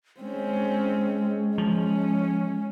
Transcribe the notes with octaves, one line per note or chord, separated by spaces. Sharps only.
G#3 C4 C#4
F3 C#4